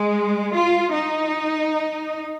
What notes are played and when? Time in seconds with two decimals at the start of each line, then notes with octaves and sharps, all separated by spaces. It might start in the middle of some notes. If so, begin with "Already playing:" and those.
Already playing: G#3
0.55 F4
0.95 D#4